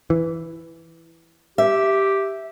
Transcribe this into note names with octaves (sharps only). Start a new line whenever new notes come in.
E3
G4 E5